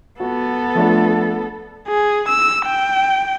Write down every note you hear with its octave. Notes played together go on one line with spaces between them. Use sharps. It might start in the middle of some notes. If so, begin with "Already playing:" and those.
B3 F#4 A4
F3 A3 D4
G#4
E6
G5